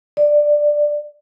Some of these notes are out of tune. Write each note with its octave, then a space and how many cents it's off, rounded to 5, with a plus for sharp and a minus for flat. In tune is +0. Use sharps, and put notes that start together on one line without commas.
D5 +10